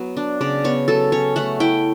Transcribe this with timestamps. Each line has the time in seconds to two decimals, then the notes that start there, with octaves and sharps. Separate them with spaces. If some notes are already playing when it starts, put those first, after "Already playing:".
Already playing: F#3 B3
0.17 D4
0.41 C#3 D5
0.64 B3 C#5
0.88 F#3 A4
1.12 C#4 C#5
1.36 A3 F#5
1.60 E4 G5